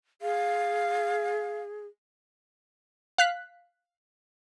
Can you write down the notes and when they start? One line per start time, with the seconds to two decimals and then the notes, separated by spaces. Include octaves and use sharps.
0.22 G#4 F5
3.18 F5 F#6 B6